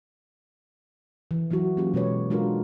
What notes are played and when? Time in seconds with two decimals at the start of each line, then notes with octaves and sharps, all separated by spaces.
1.31 E3
1.50 E3 F#3 E4 F#4
1.77 F#3 A#3 C#4 F4 G4
1.94 B2 G#3 B4 C#5
2.30 G#3 D4 F4 F#4 A#4